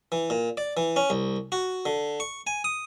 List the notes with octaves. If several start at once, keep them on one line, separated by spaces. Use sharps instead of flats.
E3
A#2
D5
E3
C#4
C2
F#4
D3
C#6
G#5
D#6